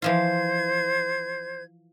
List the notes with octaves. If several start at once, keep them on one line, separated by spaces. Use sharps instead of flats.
E3 F3 F4 C5 G#6